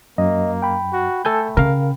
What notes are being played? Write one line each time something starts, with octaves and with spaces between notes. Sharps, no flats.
F#2 A#3 D#5
G5 B5
F#4
A3 A4 G#5 G6
C#3 A#4 F5